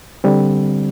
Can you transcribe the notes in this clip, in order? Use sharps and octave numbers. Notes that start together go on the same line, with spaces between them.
D3 G3 C4